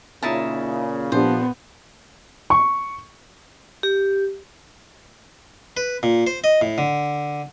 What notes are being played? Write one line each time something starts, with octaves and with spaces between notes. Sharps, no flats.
A#2 C#3 D#4 E4 A5
A#2 F3 B3 D4 G4 C5
C#6
G4
B4
A#2
C5
D#5
A2
D3